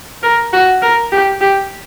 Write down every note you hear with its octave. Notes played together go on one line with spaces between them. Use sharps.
A#4
F#4
A#4
G4
G4